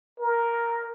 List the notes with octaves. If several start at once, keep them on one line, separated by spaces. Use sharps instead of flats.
A#4